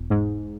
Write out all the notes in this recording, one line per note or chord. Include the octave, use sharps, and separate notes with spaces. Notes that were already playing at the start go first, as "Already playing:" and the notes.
Already playing: E1
G#2